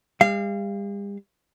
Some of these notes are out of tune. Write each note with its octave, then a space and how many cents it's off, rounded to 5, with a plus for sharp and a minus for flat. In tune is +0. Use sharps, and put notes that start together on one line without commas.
G3 +45 F5 -25